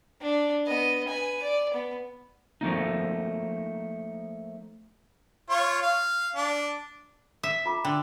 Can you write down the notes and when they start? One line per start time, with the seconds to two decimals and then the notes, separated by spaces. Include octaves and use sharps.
0.21 D4
0.67 B3 D#5
1.08 B4 G#5
1.42 D5
1.74 B3
2.61 F3 A3 A#3 D#4
5.50 F4 C#5 C#6
5.82 F5
6.36 D4
7.43 E5
7.66 F4 A#5 D6
7.85 D3 G5